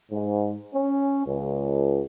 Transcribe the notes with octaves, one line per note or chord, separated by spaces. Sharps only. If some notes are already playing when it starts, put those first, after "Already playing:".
G#2
C#4
C#2